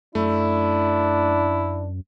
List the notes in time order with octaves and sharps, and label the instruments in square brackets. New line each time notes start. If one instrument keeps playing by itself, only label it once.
[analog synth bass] F#2 [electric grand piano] A3 [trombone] D4 [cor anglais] E4